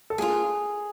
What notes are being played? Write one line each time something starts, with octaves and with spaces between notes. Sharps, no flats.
A4
A#3 D4 F4 G#4